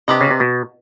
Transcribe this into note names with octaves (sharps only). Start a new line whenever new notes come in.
C3 D4 G4 B4 D#5
C#3
C3
B2